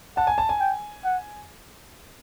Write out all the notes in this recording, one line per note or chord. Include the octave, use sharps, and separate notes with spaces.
F#5 A5
G#5
A5
G#5
G5
F#5